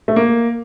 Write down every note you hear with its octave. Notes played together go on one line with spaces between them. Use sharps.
A3
A#3